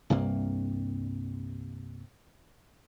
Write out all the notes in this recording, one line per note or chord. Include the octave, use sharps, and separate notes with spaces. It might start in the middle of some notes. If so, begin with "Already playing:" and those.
C2 G2 C3 A#3